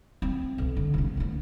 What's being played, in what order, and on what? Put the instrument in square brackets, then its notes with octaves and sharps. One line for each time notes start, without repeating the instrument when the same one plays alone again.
[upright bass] C4
B1
D3
C3 A3
A#3 B3